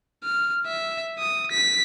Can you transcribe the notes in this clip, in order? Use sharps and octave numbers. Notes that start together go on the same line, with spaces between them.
F6
E5
D#6
B6